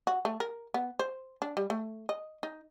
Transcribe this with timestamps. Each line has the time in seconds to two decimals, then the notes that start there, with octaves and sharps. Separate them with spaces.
0.07 F#4
0.25 A3
0.40 A#4
0.74 B3
0.99 C5
1.42 D4
1.57 G3
1.70 A3
2.09 D#5
2.43 D#4